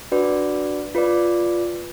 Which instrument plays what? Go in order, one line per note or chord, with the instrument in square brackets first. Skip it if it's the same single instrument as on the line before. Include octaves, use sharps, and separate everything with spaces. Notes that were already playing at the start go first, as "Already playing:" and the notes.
[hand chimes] D4 F#4 B4 D5
F4 B4 D5